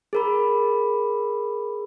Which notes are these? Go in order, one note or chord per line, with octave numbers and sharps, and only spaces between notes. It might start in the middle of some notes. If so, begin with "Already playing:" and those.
G#4 A#4 B5